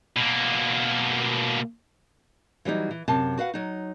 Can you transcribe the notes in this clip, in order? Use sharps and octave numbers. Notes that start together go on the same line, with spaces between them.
B2 A#3
E3 F#3 G3 D#4
E3
F#2 C3 A5
F#4 B4 F5 F#5
F#3 D#4